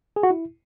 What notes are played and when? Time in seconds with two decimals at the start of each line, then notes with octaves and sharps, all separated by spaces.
0.16 G#4
0.23 F#4
0.30 E4